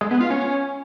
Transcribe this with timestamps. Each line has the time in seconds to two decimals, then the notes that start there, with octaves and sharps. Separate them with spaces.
0.01 G#3
0.11 B3
0.21 F4
0.30 C#4